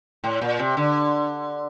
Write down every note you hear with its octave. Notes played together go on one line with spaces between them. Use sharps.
A2
A#2
C3
D3